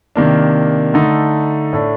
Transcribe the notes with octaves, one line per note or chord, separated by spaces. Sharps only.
C3 D#3 A#3 D4
D3 A3 D#4
A2 A3 D4